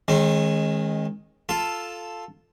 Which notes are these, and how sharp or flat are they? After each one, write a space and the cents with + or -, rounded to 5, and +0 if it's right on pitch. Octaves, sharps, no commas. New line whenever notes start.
D#3 +10 G#3 +0 C#4 -40
F4 +0 A4 +0